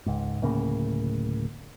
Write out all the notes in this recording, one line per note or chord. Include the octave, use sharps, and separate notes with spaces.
C#2 G#2
D1 A2 C#3 A#3